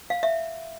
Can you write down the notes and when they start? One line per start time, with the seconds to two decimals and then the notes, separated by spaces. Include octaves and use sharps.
0.10 F5
0.23 E5